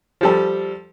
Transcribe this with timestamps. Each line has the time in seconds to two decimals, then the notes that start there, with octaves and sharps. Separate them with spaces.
0.21 F3 G3 A4